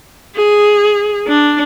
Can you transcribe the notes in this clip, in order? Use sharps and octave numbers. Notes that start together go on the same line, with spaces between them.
G#4
D4